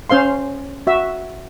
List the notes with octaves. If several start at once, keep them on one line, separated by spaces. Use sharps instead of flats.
C#4 C5 F5 C6
F#4 E5